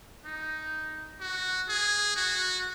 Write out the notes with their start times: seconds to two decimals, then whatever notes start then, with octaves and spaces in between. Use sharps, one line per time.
0.25 D#4
1.20 F#4
1.68 G#4
2.16 F#4